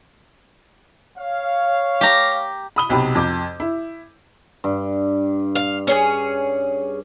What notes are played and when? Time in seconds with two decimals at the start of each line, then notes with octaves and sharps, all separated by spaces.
1.18 C#5 F5
2.01 G4 A#5
2.76 B5 D#6 G7
2.89 B1 C3 G5 B5
3.15 F2 D6 G6
3.60 E4
4.64 G2
5.55 F5
5.87 C#4 G#4 C#5